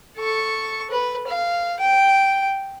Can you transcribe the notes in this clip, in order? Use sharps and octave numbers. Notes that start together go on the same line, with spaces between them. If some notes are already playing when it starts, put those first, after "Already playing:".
A4 C#6
B4
F5
G5